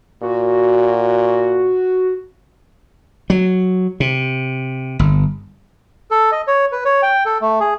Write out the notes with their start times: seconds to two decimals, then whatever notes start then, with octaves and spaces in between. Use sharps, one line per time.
0.23 A#2 F#4
3.30 F#3
4.00 C3
4.99 G1
6.11 A4
6.32 D#5
6.47 C#5
6.72 B4
6.85 C#5
7.02 G5
7.25 A4
7.41 A3
7.60 G#4